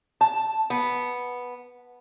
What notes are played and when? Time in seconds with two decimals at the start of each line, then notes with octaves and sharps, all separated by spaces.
0.21 A5
0.70 B3